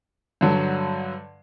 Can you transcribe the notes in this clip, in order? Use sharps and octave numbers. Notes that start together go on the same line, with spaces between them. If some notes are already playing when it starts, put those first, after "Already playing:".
G2 D3 F#3